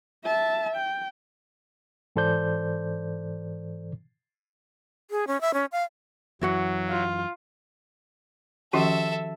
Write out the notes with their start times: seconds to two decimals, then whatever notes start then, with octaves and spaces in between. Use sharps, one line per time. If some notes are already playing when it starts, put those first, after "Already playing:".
0.25 E5 A5
0.76 G5
2.16 G#2 E3 A4 C5 D5 G6
5.11 G#4
5.27 C#4
5.41 E5
5.54 C#4
5.72 F5
6.41 F#2 E3 F#3 E4 F#4 F#5
6.90 F4
8.73 D#3 F3 C#4 F#4 G4 A4 E5